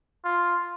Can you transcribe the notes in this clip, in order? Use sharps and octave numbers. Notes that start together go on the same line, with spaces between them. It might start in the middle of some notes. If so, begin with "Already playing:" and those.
F4